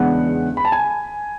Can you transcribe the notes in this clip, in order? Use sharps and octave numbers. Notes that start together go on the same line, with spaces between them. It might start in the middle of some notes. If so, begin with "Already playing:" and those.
Already playing: E2 C#3 G#3 B3 D4 F#5
B5
A5
G#5